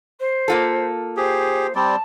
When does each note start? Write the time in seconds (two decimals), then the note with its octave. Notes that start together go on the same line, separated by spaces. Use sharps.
0.20 C5
0.48 A#3 F4 A4
1.17 G4 G#4 C5
1.75 G3 C4 D5 A5